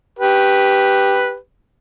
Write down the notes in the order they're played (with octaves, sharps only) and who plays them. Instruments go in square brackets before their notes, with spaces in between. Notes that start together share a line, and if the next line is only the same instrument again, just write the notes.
[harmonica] G4 B4